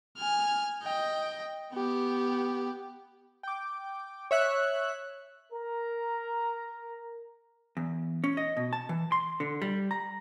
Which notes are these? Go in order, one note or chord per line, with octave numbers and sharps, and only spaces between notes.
G#5 F6
D#5 G5
B3 G4
G5 D6
C#5 E5 F#6
A#4 A#5
E2
C#4
D#5
B2
A5
E3
C6
D3
G3
A#5